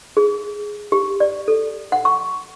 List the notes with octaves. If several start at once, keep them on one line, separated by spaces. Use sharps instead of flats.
G#4
G4
D5
A4
F#5
C#6